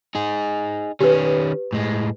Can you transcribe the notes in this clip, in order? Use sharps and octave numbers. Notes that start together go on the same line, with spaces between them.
D#4 G#4
D#3 C#4 G4 B4
A2 G#3